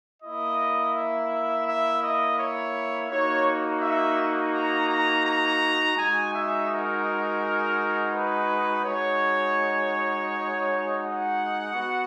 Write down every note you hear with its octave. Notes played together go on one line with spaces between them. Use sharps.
A#3 E4 D#5
E5
E5
D#5
C#5
A#3 D#4 F#4 C#5
E5
A#5
A#5
A#5
G#3 D#4 F#4 G#5
E5
A#4
B4
G#3 D#4 F#4 C#5
F#5
B3 F#4